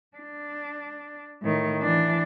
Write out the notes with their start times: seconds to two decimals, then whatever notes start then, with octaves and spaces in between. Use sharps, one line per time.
0.17 D4
1.42 A2 D#3
1.82 E3 D4